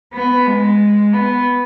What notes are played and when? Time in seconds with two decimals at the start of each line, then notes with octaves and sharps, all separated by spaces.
0.13 B3
0.46 G#3
1.13 B3